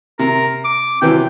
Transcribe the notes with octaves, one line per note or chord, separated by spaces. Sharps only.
C3 A#4
D6
C3 E3 F#3 G5